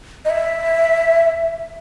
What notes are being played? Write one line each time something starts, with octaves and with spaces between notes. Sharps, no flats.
D#5
E5